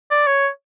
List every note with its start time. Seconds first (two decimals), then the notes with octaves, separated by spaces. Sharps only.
0.11 D5
0.26 C#5